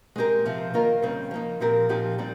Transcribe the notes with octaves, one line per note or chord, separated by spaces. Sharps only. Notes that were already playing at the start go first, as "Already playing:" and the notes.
G#3 C4 G4 A#4
C3 F3 C4
D#3 A#3 F4 A#4
C#3 G3 C4
F3 A#3 D#4
A#2 F3 C4 G4 A#4
A#2 F3 C4 D#4 G4
A#2 G3 C4